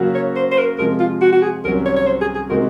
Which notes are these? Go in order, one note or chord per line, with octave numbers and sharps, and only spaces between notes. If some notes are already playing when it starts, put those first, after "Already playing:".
Already playing: C#3 F#3 A#3 C#4 F#4
C#5
C5
C5
A#4
C3 F3 G#3 A#4
F4
F#4
F#4
G#4
C2 C3 D#3 F#3 C#4 A#4
C#5
C#5
C5
G#4
G#4
C3 D#3 G#3 D#4 F#4 A#4